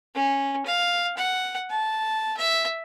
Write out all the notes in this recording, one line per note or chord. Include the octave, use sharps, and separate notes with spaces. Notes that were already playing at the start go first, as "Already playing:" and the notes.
C#4
F5
F#5
A5
E5